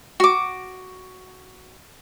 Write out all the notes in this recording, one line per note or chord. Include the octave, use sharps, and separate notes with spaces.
F#4 D6